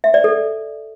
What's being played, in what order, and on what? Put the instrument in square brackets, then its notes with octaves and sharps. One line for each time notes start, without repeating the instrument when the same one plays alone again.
[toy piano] E5
D5
A4